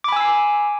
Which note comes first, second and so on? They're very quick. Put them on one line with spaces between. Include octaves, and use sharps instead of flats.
D6 B5 G#5 E6 C7